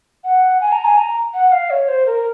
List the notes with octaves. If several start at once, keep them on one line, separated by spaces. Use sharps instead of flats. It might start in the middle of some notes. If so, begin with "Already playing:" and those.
F#5
G#5
A#5
G#5
A#5
F#5
F5
C#5
C5
A#4